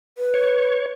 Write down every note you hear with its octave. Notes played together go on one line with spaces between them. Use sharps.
B4
C#5